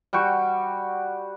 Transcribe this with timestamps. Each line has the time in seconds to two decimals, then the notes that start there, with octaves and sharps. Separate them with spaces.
0.13 G3 F#4 G5 C#6